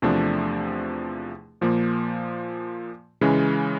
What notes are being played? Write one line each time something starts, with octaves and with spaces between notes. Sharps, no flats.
E2 C3 F3 A3 D4
A#2 F3 A#3
C#3 E3 G#3 C#4